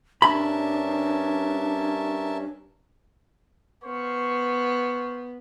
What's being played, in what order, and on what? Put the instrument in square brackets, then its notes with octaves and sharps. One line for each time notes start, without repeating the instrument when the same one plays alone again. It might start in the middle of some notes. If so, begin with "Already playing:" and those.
[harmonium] G2 C#4 [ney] D4 [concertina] A#4 E5 A5 [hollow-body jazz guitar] B5
[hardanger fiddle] B3 [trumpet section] C5 F5 C#6